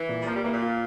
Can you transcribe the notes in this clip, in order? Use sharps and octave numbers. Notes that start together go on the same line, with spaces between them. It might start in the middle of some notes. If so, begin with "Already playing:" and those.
Already playing: E3
A#2
G3
F3 A#3
G3
E3 A#3
A#2
F4